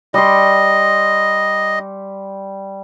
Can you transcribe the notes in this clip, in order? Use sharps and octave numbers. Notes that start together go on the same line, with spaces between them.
G3 D#5 C6